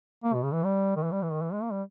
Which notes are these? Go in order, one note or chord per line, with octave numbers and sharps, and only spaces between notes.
A#3
B2
C#3
E3
G3
D#3
E3
G3
E3
D#3
E3
G#3
A#3
G3